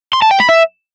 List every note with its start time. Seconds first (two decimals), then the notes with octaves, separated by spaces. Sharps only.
0.13 C6
0.22 A5
0.31 G5
0.40 B5
0.49 E5